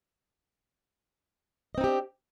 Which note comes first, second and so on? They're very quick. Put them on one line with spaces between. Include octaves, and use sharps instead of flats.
D#5 C4 D#4 G4 D4